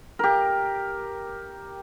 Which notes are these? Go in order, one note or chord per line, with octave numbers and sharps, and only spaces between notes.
G4 A#4